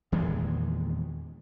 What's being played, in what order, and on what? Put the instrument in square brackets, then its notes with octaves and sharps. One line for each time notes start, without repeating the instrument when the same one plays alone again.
[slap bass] E2 A#2 D#3 G#3